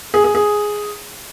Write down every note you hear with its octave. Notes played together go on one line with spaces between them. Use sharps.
G#4
G#4
G#4